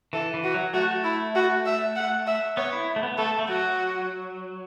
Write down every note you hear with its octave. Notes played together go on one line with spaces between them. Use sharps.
E3 A4
E3
F#4
F#3
A3 F#4
E4
F#4
E5
F#5
E5
B3 C#5
E4
A3
B3
A3 A4
A3
F#3 F#4